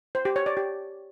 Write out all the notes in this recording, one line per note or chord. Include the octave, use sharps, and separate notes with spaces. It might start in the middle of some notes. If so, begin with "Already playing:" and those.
C5
G4
C#5
D5
G4